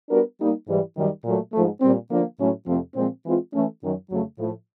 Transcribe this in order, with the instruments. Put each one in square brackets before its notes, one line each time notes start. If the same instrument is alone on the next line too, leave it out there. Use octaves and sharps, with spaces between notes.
[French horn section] G3 B3 D4 F#4 A#4
G3 A#3 D#4
G#2 E3 G3
F#2 D#3 G3
A#2 F#3 A3
G#2 F3 A3
A#2 G3 C4
D3 F3 A#3
A2 F#3 A3 C#4
F2 C3 F3 A3 C4
A#2 F3 G#3 C4
E3 G#3 C4 F4
E3 A3 C#4
F#2 D#3 F#3
F2 C#3 F#3 A3
A2 F3 A3